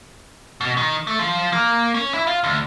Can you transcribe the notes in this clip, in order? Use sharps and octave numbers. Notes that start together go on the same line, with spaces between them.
B2
D#3
A3
F3
A#3
C#4
E4
F4
D2